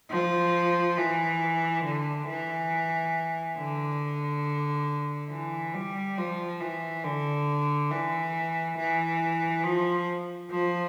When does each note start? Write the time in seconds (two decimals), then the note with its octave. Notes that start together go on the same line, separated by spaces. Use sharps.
0.10 F3
0.97 E3
1.84 D3
2.27 E3
3.57 D3
5.30 E3
5.74 G3
6.17 F3
6.60 E3
7.04 D3
7.90 E3
8.77 E3
9.63 F3
10.50 F3